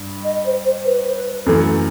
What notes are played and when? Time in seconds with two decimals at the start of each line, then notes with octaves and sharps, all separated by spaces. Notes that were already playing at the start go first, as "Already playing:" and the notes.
Already playing: G2
0.25 D#5
0.45 C5
0.65 C5
0.86 B4
1.09 C5
1.16 B4
1.46 F#2 E3 A3 A4